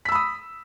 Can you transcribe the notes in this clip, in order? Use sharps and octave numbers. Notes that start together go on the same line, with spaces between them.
B5 D#6 E6 B6